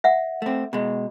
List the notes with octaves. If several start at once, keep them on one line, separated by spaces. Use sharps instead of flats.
E5 F#5
A3 C4
B2 G#3